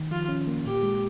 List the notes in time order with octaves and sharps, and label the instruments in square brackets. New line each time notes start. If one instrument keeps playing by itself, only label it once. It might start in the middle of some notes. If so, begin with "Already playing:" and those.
Already playing: [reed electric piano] D#3
[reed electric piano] F3 [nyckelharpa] F4
[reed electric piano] C#4
A#3
[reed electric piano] A#2 [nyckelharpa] G4
[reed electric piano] G#3